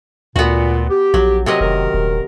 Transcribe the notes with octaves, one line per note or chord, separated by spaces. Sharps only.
D2 A#2 B3 F#4
G4
A#1 F#3
C3 F#3 G4 A#4 D#5
F1 F#2 D#3 A#4
D#1